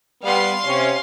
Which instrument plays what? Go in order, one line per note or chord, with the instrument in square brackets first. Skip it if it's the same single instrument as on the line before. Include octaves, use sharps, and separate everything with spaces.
[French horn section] G3 B3 [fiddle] F5 C6
[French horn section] C3 C#4